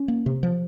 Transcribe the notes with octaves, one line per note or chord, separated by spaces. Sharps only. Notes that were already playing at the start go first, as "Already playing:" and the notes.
Already playing: C#4
A#3
C3
F3